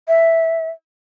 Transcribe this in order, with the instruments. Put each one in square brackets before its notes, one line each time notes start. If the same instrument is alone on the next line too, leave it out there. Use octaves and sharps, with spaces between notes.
[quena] E5